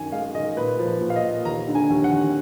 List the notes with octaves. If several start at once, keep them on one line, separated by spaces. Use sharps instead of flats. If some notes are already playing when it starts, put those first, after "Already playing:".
Already playing: F#2 D#3 G#5
G#3 F5
D#3 D#5
A#2 B4
F3
B4
A#2
F5
D#5
A#2
D#2 A#5
D3
G#5
D#2
F#5
D#2